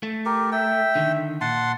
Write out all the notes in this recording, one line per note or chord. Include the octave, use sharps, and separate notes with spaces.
A3
G4 A#4
E5 G5
D3 D#3
A#2 F#5 A5 C6